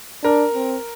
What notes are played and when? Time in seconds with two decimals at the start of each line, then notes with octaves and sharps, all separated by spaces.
0.24 D4 A#4
0.55 C4